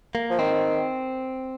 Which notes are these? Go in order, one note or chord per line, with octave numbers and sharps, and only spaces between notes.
A#3
F3
D#3 C4